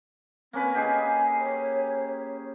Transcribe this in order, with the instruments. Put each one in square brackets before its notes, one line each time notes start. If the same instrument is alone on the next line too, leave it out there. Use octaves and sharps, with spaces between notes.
[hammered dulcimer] A#3 C#4 B4 [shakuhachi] C4
[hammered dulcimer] G4 G#4 [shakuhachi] D#5
[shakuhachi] C#5